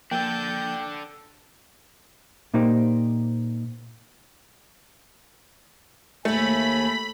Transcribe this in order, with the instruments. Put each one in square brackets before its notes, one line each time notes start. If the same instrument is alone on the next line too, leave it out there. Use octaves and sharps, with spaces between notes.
[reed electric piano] F3 A#3 [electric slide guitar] D4 A4 [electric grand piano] G5 [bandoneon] G6
[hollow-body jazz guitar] A#2 A#3 D#4 G4 C5
[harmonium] D#2 G#5 [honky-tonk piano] A3 [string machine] B5